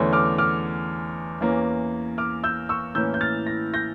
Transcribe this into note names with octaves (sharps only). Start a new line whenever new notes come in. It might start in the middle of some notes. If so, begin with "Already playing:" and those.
Already playing: E2 D3 A3 C#4
D6 F6
D6 F6
E2 E3 A#3 C#4
D6 F6
E6 G6
C#6 E6
A2 E3 A#3 C#4 E6 G6
G6
F6 A6
A#6
G6 A#6